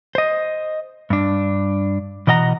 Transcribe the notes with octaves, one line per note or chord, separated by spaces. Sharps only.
C5 D#5
G2 D4
B2 E3 D#5 F#5 A#5